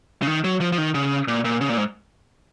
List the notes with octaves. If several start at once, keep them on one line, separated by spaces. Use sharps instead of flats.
C#3
D#3
F#3
F3
F3
D#3
C#3
A#2
A#2
C#3
A#2
G#2